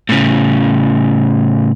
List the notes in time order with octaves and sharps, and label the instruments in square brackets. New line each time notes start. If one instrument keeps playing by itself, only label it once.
[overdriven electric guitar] A2 C#3